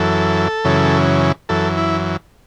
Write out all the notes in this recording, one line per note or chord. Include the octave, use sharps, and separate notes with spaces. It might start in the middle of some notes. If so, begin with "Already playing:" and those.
Already playing: F#2 E3 A4
F#2 C#3 E3
F#2 E3 A4
E4